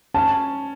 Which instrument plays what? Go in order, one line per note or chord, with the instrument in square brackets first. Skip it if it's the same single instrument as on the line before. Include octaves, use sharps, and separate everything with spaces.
[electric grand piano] C#4 [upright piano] A5